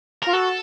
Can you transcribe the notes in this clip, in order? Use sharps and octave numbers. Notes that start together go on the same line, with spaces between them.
F4 A#4
F#4 A4